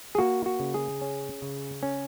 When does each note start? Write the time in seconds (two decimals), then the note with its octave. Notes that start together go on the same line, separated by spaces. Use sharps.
0.15 G#4
0.18 A#3 F#4
0.46 F#4
0.60 C#3
0.74 G#4
1.01 C#4
1.42 C#3
1.83 C#4